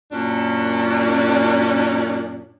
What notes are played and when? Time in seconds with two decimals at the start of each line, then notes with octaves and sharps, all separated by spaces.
0.11 F#2 A#2 C#4 D4